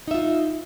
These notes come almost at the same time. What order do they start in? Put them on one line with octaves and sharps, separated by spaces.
D#4 E5 F4